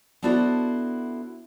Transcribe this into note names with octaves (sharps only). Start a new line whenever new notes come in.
B3 D4 E4 F#4 A4 C5